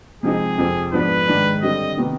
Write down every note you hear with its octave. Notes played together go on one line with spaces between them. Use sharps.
C3 F3 G#3 C4 D#4 G#4
F2 C3 F3 C4
G#2 F3 B3 D4 B4
G#2 D#3 G#3 D4
D3 G3 C4 D#5
C3 D#3 B3